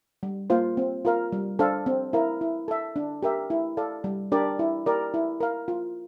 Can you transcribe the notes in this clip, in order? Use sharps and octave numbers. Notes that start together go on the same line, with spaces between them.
G3
A#3 F4 C5 F5
C4
F4 A#4 F5
G3
D4 A4 C5 F5
C4
E4 A#4 F5
E4
A4 E5
D4
G4 A#4 E5
E4
A4 D5 F5
G3
D4 G4 A#4 D5
E4
G4 A#4 D5
E4
A#4 F5
F4